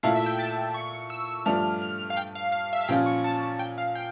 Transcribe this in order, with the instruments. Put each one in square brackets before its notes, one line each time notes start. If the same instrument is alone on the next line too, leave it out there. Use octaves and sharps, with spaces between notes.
[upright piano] A#2 A3 E4 [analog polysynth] F5
[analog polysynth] E5
G5
A5
C#6
E6
[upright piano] G2 F3 A3 D4 [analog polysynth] F6
[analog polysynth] F6
F5
G5
F5
F5
E5
F5
[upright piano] A#2 F3 C#4 F4 [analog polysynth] G5
[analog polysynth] C#6
A5
G5
F5
G5